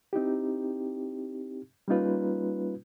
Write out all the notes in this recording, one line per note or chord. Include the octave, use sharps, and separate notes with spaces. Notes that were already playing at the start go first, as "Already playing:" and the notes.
C4 D#4 E4 G4
G3 A#3 C#4 D#4 F4 B4